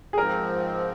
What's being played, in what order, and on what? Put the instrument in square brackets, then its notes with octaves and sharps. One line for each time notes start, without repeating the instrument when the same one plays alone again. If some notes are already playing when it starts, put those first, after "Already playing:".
[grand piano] G#4
[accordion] G#2 F3 C4 [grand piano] A#4